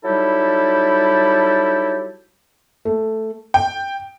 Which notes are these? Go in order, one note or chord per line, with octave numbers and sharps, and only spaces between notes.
F#3 G3 D#4 E4 G4 A4
A3
G5